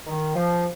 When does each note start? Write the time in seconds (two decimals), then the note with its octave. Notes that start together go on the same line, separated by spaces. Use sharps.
0.06 D#3
0.35 F3